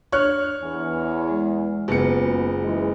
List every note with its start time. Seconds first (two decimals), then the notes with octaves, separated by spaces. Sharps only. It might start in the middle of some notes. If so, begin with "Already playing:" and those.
0.12 D4 C#5 F6 F#6
0.62 E2 G#5
1.30 G#3
1.88 F#1 G#3 B3 F4 G#4 C#7
2.63 E3 G#3